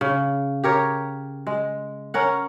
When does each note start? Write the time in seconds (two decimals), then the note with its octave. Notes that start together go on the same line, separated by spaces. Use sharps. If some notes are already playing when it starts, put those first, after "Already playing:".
0.01 C#3
0.64 G4 A#4 C#5
1.47 G#3
2.14 C#4 A#4 F#5